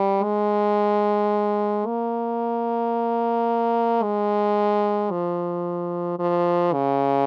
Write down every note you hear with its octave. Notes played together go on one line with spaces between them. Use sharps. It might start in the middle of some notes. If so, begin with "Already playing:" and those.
Already playing: G3
G#3
A#3
G#3
F3
F3
C#3